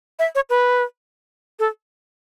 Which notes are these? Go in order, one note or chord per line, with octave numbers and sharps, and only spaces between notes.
E5
C#5
B4
A4